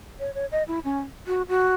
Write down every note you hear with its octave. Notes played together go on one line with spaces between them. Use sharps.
C#5
C#5
D#5
E4
C#4
F#4
F#4